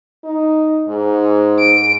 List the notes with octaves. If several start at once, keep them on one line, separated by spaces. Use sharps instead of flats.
D#4
G#2
D7